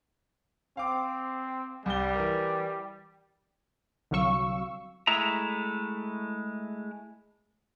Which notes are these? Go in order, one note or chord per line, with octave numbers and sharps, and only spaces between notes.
C4 F5 D6
C2 G3 G7
E3 A#4
C2 D3 F#3 F5 C#6 E6
G#3 A3 E4 E5 A#5